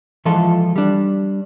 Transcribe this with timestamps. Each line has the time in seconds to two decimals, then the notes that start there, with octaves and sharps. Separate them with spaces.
0.25 E3 F3 G#3 F4 A4
0.76 G3 D4